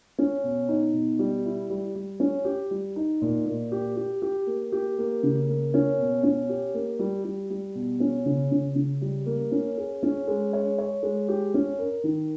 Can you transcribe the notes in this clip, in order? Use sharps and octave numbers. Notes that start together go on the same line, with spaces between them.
C#4
B2
D#4
B2
G3
E4
G3
G3
C#4
G4
G3
D#4
A#2
A#2
G4
G4
G4
A#3
G4
A#3
C#3
A#3
C#4
B2
C#4
G4
A#3
G3
G3
G3
B2
C#4
C#3
C#3
C#3
G3
A#3
C#4
G#4
C#4
G#3
C#5
C#5
G#3
G4
C#4
A#4
D#3